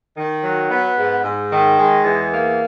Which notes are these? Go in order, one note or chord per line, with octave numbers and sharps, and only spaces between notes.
D#3
F#3
B3
G#2
G#2
D#3
G#3
E2
A#3